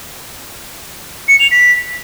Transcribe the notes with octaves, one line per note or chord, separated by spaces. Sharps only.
C#7
F7
B6